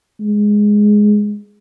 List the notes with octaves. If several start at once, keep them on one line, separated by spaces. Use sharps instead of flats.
G#3